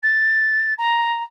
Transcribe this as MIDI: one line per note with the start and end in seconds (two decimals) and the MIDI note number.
0.03 0.74 93
0.78 1.23 82